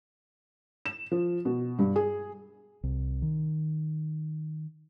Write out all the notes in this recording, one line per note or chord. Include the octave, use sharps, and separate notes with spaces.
E7
F3
B2
G2
G#4
C2
D#3